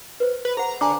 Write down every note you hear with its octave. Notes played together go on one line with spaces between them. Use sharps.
B4 C5
B4
G#4 C5 F#5 A#5
D3 G#5 A#5 D6